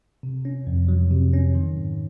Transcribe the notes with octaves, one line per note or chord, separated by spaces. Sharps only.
C3
C#4
F2
F#3
C3
C#4
D#3
G#2